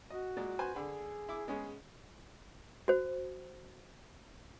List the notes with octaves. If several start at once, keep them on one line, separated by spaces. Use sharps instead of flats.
F#4 D#5
A#2 G#3 D5
B4 C5 G#5
D3 G#4 B5
E4 D6
G#3 B3 C#4
F#4 C5